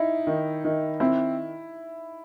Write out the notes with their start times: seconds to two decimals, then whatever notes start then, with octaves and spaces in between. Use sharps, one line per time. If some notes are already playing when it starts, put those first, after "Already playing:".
Already playing: D#4 E4
0.27 D#3
0.65 D#3
1.00 C4 E4